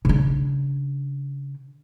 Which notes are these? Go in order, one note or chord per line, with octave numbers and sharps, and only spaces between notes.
C#3 D4